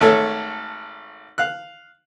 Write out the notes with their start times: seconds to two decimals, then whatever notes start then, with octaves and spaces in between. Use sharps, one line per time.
0.01 G#1 A3 A4 C#5
1.38 F5 F#6